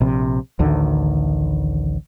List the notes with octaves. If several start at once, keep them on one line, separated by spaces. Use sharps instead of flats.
A#1 C3
A1 D2 D3 D#3